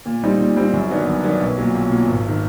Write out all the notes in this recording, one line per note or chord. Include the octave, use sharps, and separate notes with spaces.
A#2
G3 C4 D#4
A#2
G3 C4 D#4
F#2
D#3 F#3 B3 D4
F#2
D#3 F#3 B3 D4
B1
A#2 F#3
B1
A#2 F#3
G#1
D#3